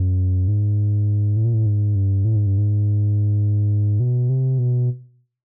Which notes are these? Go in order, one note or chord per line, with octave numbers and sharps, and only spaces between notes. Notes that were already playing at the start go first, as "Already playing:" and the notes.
Already playing: F#2
G#2
A2
A#2
A2
G#2
G2
A2
G#2
G2
G#2
B2
C3
B2